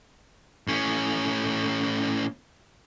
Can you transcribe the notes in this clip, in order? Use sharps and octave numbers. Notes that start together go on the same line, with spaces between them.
A2 C#4